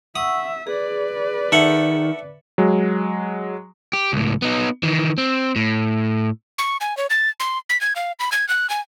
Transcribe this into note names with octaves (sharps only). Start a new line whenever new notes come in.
E5 F#5 C#6 D#6 E6
G#4 B4 D5
D#3 A4 E5 F#5
F#3 G#3
G4
C#2 A2
B3 D#4
D#3 E3
C4
A2
C#6
G#5
C#5
A6
C6
B6
G#6
F5
B5
G#6
F#6
G#5